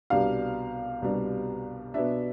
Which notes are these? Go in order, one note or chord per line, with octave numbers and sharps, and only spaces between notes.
C2 B2 G3 D4 F5
C2 B2 G3 D4
B2 B3 D4 E5